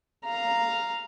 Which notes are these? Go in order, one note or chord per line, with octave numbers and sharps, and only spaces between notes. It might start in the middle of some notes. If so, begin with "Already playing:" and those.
F5 A#5